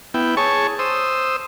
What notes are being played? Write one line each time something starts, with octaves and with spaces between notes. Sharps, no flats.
B3 E4 G5
G#4 C#5 A5 C#6
C5 D#6 E6